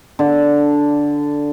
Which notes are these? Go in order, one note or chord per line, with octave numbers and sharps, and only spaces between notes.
D3